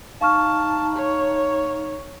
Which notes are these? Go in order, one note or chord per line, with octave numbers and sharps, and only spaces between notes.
D#4 F5 A5 C#6 F6
C#5